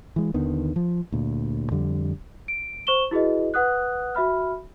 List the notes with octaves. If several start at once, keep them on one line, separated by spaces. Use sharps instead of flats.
E3 G#3
D#2 D3 D#3 B3
F3
D2 A#2
F2 D3 G3
D7
C5 C#6 E7 G7
E4 F#4 G#4 B4 D#5
B4 F#5 D#6 F#6
F#4 E5 B5 F6